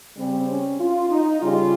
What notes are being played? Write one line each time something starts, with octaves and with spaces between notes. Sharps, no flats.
C#3 G3 C4
C#4
F4
D#4
C#3 G3 F4